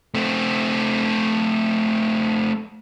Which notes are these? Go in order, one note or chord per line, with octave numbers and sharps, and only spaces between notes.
A3 C4